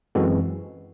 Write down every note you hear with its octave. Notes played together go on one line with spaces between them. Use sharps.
F#2 E3 G#3 C4 F#4 A4